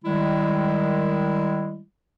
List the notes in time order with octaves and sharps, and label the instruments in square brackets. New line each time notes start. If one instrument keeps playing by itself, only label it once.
[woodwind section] D#3 G3 G#3 E4